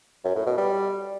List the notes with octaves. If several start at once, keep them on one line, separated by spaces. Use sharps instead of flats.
F#2
A2
B2
G3